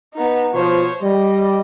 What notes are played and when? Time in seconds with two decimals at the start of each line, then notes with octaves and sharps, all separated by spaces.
0.14 B3 D#4
0.54 B2 F3 C5 C#5
1.02 G3 D#5